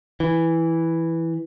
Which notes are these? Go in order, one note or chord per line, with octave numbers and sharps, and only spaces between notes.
E3